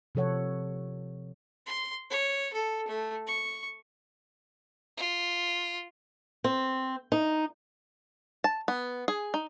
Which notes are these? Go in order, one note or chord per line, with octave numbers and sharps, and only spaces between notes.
C3 F3 A4 C#5 F#5
C6
C#5
A4
A3
C#6
F4
C4
D#4
A5
B3
G#4
D#4